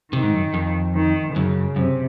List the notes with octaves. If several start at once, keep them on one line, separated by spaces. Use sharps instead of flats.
C3 D#3
G#2
F#2
F2
D#3
F#2 C#3
F#2 C3